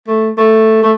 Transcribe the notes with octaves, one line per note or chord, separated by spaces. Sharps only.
A3
A3
A3